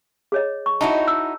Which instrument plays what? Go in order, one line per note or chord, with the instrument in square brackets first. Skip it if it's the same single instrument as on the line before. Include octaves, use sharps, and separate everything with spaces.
[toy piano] G#4 C#5 D#5
C#6
[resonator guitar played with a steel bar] D#4 E4 F#4 [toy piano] A5
[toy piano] E6